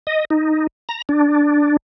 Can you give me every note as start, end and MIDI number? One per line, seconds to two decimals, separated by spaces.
0.07 0.25 75
0.30 0.67 63
0.89 1.02 82
1.09 1.77 62